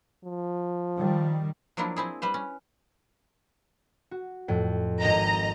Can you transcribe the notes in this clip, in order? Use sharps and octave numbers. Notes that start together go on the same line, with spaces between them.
F3
D#3 G3
F3 F#3 A#3 D4 E4
C4 E4 G#4
G3 B4 C5
C#4
F#4
F2 A2
G#1 D#5 A#5 E7